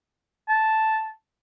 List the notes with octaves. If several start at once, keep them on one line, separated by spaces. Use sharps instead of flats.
A5